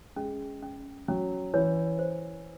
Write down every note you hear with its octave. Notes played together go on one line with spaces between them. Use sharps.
G#3 C#4
C#4
F#3 C#4
E3 C#5
C5